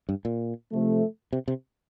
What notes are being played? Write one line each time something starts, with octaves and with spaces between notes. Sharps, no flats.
G2
A#2
C3 F3 A3
C3
C3